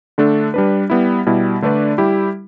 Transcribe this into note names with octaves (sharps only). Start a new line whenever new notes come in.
D3 A3 D4 A4
G3 D4 B4
G3 B3 E4
B2 G3 E4
D3 A3 D4 B4 D5
G3 E4 G4